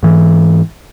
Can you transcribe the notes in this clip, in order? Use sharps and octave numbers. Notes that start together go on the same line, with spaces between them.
G#2 E3